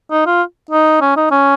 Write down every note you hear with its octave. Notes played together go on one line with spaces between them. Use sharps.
D#4
F4
D#4
C#4
D#4
C#4